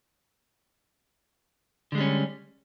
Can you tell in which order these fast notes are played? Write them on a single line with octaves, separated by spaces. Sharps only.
D3 G#3 G3 C#4